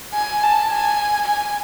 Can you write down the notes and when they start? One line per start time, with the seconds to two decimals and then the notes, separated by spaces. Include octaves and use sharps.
0.14 G#5
0.43 A5
0.70 G#5
1.27 G#5